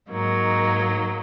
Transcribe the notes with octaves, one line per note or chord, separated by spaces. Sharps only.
G#2 F#3 A#3 D#4